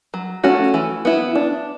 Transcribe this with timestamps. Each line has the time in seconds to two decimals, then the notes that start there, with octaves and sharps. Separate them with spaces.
0.14 F#3
0.44 A3 C#4 F#4
0.74 E3
1.05 B3 E4
1.35 D4